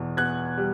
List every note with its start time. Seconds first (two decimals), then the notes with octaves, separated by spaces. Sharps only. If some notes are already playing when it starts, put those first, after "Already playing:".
Already playing: E2 B2
0.17 B3 F#6 G#6
0.58 G3